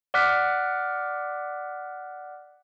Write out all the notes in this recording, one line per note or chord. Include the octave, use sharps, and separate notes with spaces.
D5 F#5 D6 F6 F#6 B6